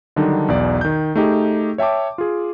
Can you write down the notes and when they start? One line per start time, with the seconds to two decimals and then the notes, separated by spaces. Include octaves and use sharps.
0.16 D3 D#3 F#3 G3 D4 D#4
0.48 B1 E2 D5
0.81 D#3 G6
1.15 A3 D#4 G4 G#4
1.78 C#5 E5 G5 A5 D6
2.18 F4 G#4